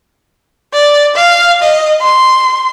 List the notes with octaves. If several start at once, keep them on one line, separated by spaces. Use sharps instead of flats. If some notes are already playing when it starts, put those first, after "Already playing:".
D5
F5
D#5
C6